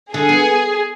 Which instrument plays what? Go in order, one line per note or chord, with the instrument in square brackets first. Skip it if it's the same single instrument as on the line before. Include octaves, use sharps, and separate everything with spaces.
[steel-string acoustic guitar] D3 [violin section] G#4
[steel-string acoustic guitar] B3